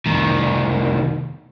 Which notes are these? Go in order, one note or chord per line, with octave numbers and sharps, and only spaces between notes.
C2 D#3